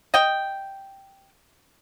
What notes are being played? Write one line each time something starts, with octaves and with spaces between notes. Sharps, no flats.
D#5 G5